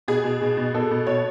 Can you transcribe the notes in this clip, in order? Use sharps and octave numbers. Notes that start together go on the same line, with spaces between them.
B2 G#4
B2
B2
B2
B2 A4
B2
B2 C#5